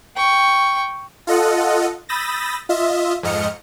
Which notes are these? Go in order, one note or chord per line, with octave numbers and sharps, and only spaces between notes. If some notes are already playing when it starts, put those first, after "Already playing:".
G5 C#6
F4 A4 D#5 F#5
B5 D#6 E6 G6 A6 A#6
F4 D#5 E5
F2 G#2 D#5 F6 C#7